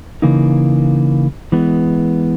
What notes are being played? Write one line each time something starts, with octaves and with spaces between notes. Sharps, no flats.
C#3 E3 A#3 D#4
E3 G#3 B3